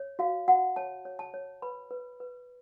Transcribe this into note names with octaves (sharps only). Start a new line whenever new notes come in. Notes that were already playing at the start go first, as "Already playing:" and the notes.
Already playing: C#5
F#4 F5
F#4 F#5
C#5 A5
C#5
A5
C#5
B4 B5
B4
B4